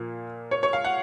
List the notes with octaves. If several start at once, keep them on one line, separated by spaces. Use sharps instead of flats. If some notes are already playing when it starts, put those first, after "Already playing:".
Already playing: A#2 F3 A#3
C#5
C#5
F5
F#5